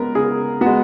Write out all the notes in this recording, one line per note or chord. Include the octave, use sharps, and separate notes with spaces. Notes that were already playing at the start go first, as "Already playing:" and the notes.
Already playing: C#3 G#3 B3 A#4
C#3 G#4
G#3 B3 F#4